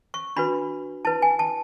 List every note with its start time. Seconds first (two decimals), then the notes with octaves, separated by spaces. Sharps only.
0.14 C#6
0.36 D4 F#4 B4 B5
1.05 E4 B4 A5
1.22 G#5
1.39 A5